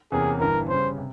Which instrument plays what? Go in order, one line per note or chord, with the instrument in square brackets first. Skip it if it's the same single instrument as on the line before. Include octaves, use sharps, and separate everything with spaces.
[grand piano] E2 C3 E3 A#3 C#4 [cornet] G#4
[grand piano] G1 G2 E3 [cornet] A#4
[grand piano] C#3 G3 C#4 [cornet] C5
[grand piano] C3